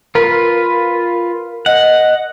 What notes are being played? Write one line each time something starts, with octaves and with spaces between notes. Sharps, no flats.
F4 A#4 B4
D#5 F#5